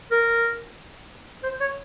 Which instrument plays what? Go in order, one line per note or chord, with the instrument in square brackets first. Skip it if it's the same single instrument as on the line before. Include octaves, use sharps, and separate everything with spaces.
[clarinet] A#4
C5
C#5